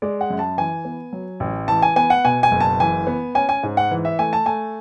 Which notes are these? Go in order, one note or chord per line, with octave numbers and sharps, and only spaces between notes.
G#3 D5
F#5
F#2
A5
E3 G#5
B3
F#3
A1
E3 A5
G#5
B3 G#5
F#5
B2 G#5
G#5
F#1
A5
E3 G#5
B3
C#4 G#5
G#5
G#2
F#5
E3
E5
A3 G#5
A5
A3 G#5